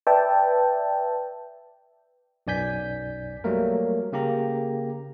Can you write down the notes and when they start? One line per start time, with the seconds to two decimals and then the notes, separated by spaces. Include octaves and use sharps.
0.07 B4 D5 E5 G5 A5
2.47 B1 F#2 D5 G#5 G6 B6
3.44 F#3 G3 A3 A#3 A#4
4.13 C#3 A#3 G4 A#5